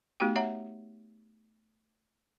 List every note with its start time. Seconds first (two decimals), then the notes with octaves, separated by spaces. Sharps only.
0.20 A3 B3 D#4 F#4 G4 G5
0.36 C#5 E5 F#5 A#5